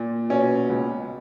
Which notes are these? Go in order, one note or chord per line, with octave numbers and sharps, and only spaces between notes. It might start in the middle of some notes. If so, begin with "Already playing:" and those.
Already playing: A#2
B2 C#4
C#2